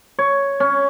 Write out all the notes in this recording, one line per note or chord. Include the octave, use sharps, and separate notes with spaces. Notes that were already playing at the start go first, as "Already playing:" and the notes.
C#5
C#4